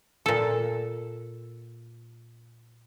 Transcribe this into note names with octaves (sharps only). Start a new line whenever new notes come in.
A#2 A4